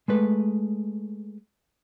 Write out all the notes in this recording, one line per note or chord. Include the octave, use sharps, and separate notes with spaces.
G#3 A3 B4